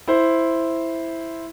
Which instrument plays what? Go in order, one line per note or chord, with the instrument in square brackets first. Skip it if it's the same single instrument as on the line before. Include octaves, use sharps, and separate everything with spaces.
[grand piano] E4 C5